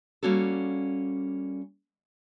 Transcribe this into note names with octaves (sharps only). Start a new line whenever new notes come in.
G3 A#3 C#4 F#4 A4